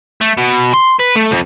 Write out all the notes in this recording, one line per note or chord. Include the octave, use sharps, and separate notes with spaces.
A3
B2
C6
B4
A3
F2